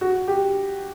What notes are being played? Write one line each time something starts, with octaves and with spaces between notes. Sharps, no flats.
F#4
G4